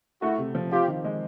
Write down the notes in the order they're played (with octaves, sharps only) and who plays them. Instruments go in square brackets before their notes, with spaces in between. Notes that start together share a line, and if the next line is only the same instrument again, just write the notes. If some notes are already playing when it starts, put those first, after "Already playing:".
[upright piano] A3 [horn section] E4 F#4
[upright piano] C3
F3
[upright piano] C4 [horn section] F4 G4
[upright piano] D#3
G#3